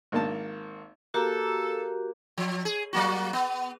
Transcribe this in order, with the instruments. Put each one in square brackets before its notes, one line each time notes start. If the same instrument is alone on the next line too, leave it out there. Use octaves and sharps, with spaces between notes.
[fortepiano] G#1 A#3 A5
[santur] A#3 [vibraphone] F#4 G4 [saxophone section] A4
[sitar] F3
G#4
F#3 A#3 F#4
B3